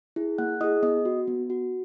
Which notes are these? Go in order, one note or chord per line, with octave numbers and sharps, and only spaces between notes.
E4 G#4
A#3 F#5 F#6
E4 G#4 D#5 D#6
B3 D#5 D#6
F#4
B3
F#4